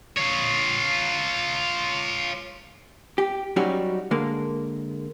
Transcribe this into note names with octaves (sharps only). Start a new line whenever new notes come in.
F4 C#5
G4
F#3 G3 C#4 D#4 F#4 G4
D3 G#3 A#3